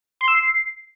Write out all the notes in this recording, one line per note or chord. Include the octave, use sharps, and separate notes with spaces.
C6
E6
C7